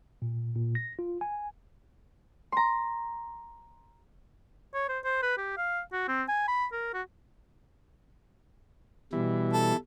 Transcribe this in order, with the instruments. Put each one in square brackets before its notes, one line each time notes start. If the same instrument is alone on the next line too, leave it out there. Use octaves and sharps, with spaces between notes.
[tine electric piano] A#2
A#2
A#6
F4
G#5
[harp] A#5 C6
[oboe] C#5
C5
C5
B4
G4
F5
F#4
C4
G#5
B5
A#4
F#4
[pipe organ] B2 G3 [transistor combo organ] E3
[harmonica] A4